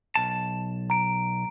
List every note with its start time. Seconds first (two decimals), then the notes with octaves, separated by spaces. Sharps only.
0.15 B1 A5
0.90 A#5 D7